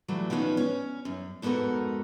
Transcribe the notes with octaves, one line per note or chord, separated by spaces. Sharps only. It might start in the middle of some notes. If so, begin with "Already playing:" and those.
E3 F#3 G3 A3
D#3 F3 F#3 B3 C#4
C#4
F#2
F2 G#2 B3 F#4 A4 A#4